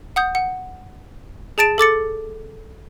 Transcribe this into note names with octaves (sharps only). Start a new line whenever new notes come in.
F#5 D#6 G6
F#5
G#4 A5 A6 D7 E7
A4 D6 A6 C#7